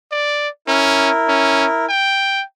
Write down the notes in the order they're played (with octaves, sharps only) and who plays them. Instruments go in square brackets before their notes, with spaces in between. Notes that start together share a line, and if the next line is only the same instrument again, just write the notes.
[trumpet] D5
[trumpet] C#4 [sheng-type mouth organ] E4 A#4
[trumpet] C#4
G5